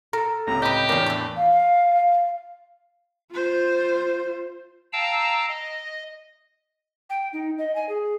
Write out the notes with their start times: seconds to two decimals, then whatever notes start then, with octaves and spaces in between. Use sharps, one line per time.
0.13 A4 A#4
0.47 C#2 A2 C3 A#5
0.62 G4 B4 D#5
0.89 E2 A2 D4 D#4 G#4 A#4 C#5 D6
1.06 E3 A3
1.37 F5
3.31 F4 C5
4.93 F5 G5 A5 A#5 E6
5.48 D#5
7.10 G5
7.33 D#4
7.58 D#5
7.75 G#5
7.89 G#4